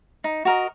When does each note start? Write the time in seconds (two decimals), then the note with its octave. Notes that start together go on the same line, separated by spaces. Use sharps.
0.24 D#4
0.45 F#4 A#4 D#5